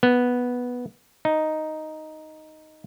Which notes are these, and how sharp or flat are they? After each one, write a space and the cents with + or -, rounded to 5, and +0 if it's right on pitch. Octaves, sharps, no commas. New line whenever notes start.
B3 -5
D#4 +0